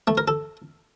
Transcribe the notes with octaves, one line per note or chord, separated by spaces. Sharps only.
A3
A#4
A4